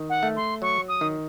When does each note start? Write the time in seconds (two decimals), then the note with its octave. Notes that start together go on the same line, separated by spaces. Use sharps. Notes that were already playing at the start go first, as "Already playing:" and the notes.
Already playing: D#3
0.09 F#5
0.23 A3
0.36 C6
0.62 F#3 C#6
0.88 D#6
1.01 D#3